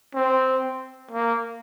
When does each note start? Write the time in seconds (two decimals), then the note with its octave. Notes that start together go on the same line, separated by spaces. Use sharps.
0.15 C4
1.11 A#3